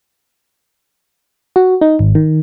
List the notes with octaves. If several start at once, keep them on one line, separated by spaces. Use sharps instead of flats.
F#4
D#4
G#1
D#3